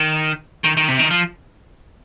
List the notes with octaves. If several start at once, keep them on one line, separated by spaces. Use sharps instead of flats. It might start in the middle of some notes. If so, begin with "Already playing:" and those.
Already playing: D#3
D#3
D#3
C3
D#3
F3